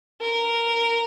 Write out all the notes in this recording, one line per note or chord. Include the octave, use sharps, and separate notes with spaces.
A#4